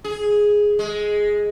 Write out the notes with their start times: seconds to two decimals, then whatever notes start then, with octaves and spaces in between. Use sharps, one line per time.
0.04 G#4
0.79 G#3